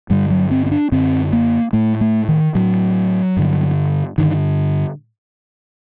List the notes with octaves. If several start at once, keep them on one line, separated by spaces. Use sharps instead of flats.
G2 D3 G3
F#3
C4
C4
D4
F#2 D3 C4
A#3
A2 A3
A3
D#3
A2 F#3
G2 D3
G2 D3 D#3